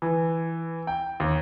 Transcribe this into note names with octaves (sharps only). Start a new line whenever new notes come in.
E3
G5
D#2